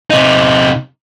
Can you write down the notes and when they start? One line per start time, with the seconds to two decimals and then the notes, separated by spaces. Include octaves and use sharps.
0.10 C3 D#4